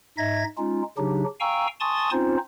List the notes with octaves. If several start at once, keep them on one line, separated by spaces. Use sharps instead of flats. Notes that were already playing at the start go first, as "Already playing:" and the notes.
G#2 D#4 D#5 E5 G#6 A#6
G#3 C#4 D#4 F4
C#3 F#3 D4 D#4 G4
F5 G5 G#5 A#5 C#6 E6
G#5 A5 C6 C#6 D#6 A6
C4 C#4 D#4 F4 C5